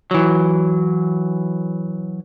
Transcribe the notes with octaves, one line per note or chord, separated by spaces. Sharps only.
E3 F#3